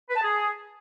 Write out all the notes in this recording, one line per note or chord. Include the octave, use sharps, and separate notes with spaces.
B4
A5
G#4